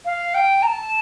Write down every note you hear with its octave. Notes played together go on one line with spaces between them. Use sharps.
F5
G5
A#5
A5